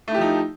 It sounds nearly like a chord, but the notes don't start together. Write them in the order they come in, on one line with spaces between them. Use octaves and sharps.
A3 E4 G4 F3 D#4